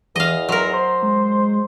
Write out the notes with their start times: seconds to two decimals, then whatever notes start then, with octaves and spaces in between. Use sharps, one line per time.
0.16 E2 E3 D#5 F5
0.49 F#3 A#4 C6
0.74 C5
1.03 G#3